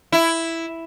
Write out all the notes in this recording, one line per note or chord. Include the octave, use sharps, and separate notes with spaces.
E4